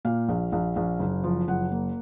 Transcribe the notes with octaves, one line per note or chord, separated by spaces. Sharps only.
A#2 F5
A#1
A#1
A#1
F#1
F3
F#1 F#5
A#3